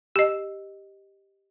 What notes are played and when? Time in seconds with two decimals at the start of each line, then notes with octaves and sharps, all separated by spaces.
0.16 G4 D#5